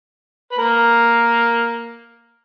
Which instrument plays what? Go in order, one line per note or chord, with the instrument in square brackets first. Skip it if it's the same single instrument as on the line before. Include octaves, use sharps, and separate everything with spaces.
[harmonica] B4
A#3 A#4